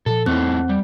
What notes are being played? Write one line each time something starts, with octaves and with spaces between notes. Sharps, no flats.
A#2 F3 A4
E2 A3 C4 D#4 E4
G3